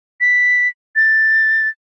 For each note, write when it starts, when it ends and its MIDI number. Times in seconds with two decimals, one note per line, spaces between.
0.21 0.68 95
0.96 1.69 93